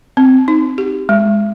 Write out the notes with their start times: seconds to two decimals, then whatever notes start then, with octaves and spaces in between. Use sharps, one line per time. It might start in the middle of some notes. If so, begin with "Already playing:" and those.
0.17 C4
0.48 D#4
0.78 G4
1.09 G#3